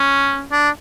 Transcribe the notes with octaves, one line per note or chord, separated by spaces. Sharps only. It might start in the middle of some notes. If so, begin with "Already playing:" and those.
Already playing: C#4
D4